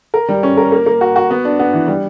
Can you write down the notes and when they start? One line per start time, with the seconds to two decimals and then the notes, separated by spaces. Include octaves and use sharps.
0.14 A#4
0.29 G3
0.43 C#4
0.57 A#4
0.72 A#3
0.86 A#3
1.01 F#4
1.16 F#4
1.31 B3
1.45 D4
1.59 B3
1.73 E3
1.88 G3